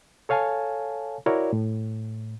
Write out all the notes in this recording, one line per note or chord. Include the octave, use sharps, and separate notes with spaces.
A4 C#5 F5 G#5 A5
E4 F#4 A#4 C#5 D5
A2